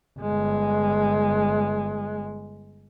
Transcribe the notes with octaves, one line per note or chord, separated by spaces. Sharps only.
G1 G#3